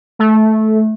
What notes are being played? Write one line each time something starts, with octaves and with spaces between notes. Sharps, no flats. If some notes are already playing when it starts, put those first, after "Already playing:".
A3